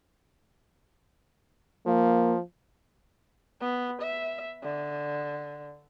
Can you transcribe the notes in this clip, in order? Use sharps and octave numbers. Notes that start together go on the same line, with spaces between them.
F3 A#3
B3
E5
D3